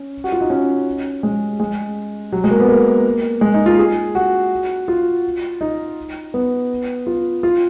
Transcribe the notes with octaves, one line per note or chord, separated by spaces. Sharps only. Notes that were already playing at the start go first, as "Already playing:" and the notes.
Already playing: C#4
F#4
F4
D#4
C#4
G#3
G#3
F#3
G#3
A#3
B3
A#3
G#3
D#4
F4
G#4
F#4
F4
D#4
B3
F4
F4